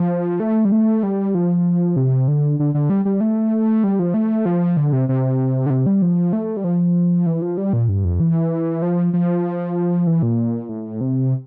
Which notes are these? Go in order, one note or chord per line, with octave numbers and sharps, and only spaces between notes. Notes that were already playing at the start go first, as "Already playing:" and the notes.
Already playing: F3
A3
G3
A3
G3
F3
C3
D3
D3
D3
G3
G3
A3
G3
F3
A3
F3
D3
C3
C3
D3
C3
G3
F3
A3
G3
F3
E3
F3
G3
A#2
G2
F2
E3
F3
F3
E3
A#2
A2
C3